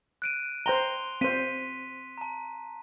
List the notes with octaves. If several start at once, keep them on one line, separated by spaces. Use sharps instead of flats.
F#6 D7 D#7
C5 G5 A#5 C6 F7 G7
C4 C5 B6 D#7
A5 A#5